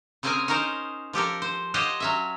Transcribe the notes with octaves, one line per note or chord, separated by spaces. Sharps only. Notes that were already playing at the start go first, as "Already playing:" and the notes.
C#3 C4 C#4 G#4 A#4 G#5
C#4 D#4 G#4 A#4 C5
F3 G4 A4 A#4
C5
F4 G4 C5 C#5 D#5 F#5
F#3 C#4 E5